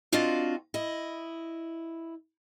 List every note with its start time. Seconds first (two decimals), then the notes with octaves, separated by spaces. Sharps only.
0.12 C4 D4 F4 F#4 D#5 F5
0.74 E4 D#5